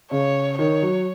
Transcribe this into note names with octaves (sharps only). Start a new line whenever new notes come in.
C#3 C#5
D#3 C#5
F#3